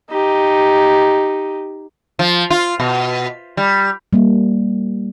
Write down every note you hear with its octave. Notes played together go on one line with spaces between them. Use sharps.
D#4 G4
F3
F4
B2
G3
G3 A#3